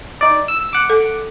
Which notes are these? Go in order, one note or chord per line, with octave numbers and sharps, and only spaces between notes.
D#4 D5
E6
F#5 D6
A4